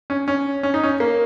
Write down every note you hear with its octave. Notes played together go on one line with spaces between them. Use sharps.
C#4
C#4
C#4
D#4
C#4
A#3